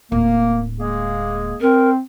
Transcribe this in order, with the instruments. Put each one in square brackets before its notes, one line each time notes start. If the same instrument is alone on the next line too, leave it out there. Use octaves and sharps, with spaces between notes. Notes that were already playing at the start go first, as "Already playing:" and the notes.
[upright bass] D1 [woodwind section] A#3
[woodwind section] G#3 A#3 G#4
[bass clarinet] C4 [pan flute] A#4